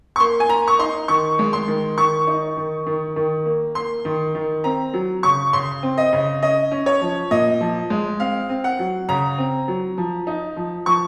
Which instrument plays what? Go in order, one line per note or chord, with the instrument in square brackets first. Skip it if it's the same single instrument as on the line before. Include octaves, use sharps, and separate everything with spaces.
[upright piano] C#6
A#3 C6
G#5
A#3 A#5
C#6
D#4 C6
D#3 C#6
G#3
C6
D#3
D#3 C#6
D#4
D#3
D#3
D#3
A#3
A#3 C6
D#3
D#3
C4 A#5
F#3
C#3 C#6
C#3 C6
C4
D#5
C#3
C#4 D#5
C#4
C#5
F3
A#2 D#5
F3
G#3
C4 F5
C4
F#5
F#3
C#3 A#5
C4
F#3
F3
D#4
F3
F3 C#6